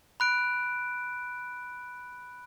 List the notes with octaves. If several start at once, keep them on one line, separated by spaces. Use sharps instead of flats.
B5 F#6 D7